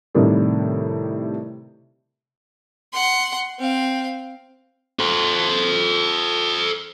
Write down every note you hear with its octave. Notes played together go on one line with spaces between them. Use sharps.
A2 C3 D#3 G3 D4
F#5 C6
C4 F5
A4 C5